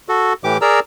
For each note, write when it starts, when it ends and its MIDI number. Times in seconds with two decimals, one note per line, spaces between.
0.09 0.33 66
0.09 0.33 69
0.44 0.58 45
0.44 0.58 52
0.44 0.58 67
0.44 0.58 86
0.62 0.80 68
0.62 0.80 70
0.62 0.80 74
0.62 0.80 82
0.62 0.80 88